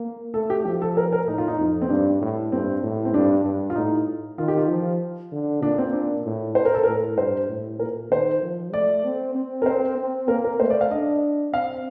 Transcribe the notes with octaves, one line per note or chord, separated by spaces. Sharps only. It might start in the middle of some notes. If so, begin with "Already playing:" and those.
Already playing: A#3
A3 A4
G4
F3 G4
A4
A#4
A#4
A2 D#4
F4
D#4
F2
C4
G2 D4
A2
G2 C4
A2
C4
G2 D4
G2
F4
A2 D#4
D#3 F4
G4
F4
F3
D3
A#2 D4
C4
D4
A2
C5
A#4
A4
A2 A#4
G2 C5
A2
A#2 A#4
D#3 C5
F3
A3 D5
C4
C4
A#4
C4 C5
C4
A#3 A#4
A#4
A3 C5
D5
F5
D4 D#5
C4 F5